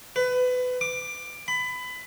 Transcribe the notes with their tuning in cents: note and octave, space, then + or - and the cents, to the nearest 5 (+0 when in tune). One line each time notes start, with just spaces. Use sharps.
B4 +25
D6 +15
B5 +20